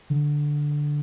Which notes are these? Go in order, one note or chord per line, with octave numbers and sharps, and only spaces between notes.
D3